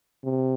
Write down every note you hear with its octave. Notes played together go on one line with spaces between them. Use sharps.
C3